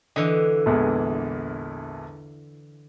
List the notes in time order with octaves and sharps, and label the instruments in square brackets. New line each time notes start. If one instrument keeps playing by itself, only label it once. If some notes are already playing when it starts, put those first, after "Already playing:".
[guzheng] D3 E3 [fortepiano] D#5
[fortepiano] A#1 E2 G#3